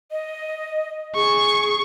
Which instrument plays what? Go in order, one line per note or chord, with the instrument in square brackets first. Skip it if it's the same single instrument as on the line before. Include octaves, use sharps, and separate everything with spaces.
[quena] D#5
[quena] G#4 [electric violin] C#6